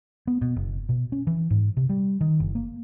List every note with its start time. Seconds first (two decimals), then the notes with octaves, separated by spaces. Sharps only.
0.27 B3
0.42 B2
0.56 F#1
0.89 B2
1.12 C#4
1.27 E3
1.50 G#2
1.77 C3
1.89 G3
2.21 D#3
2.40 F#1
2.55 A#3